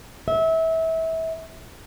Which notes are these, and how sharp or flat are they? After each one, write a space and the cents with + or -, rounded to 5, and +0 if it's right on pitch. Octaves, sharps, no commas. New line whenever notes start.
E5 -25